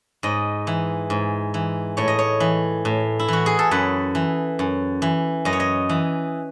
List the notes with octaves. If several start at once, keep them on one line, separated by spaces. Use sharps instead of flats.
G#2 D#5
E3
G#2
E3
A2 C#5
D#5
C#5
E3
A2
E4
E3 F#4
G#4
A4
F#2 B4
E3
F#2
E3
F#2 D#5
C#5
D#5
E3